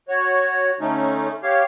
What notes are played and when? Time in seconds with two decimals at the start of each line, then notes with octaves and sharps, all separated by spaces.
0.09 F#4 C#5
0.80 D3 A3 C#4 D#4
1.43 G4 C#5 F5